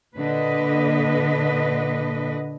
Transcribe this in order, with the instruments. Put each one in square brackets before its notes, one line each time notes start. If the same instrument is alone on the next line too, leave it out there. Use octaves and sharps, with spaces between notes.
[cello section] A#2 D3 B4 D#5